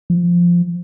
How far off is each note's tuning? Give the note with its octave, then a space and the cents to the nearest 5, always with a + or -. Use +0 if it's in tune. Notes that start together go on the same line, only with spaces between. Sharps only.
F3 -5